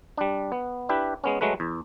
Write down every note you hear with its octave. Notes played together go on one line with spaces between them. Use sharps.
G3 D4
B3
D4 E4 G4 B4
G#3 B3 C#4
F#3 G#3 A3 B4
E2